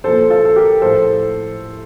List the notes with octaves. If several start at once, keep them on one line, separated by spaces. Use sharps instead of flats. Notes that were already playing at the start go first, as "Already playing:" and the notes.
A#2 F3 A4 C5
F4 A4
A4
G4 A#4
A2 F3 A4 C5